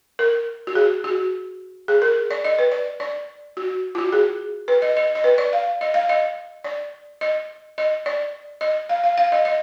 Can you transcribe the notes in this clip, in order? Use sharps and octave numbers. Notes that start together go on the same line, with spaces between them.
A#4
F#4
G#4
F#4
G#4
A#4
D5
D#5
B4
D5
D5
F#4
F4
F#4
G#4
B4
D#5
D#5
D#5
B4
D5
F5
D#5
F5
D#5
D5
D#5
D#5
D5
D#5
F5
F5
F5
D#5
D#5